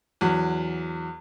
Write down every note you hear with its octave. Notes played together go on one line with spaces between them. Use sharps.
E2 F#3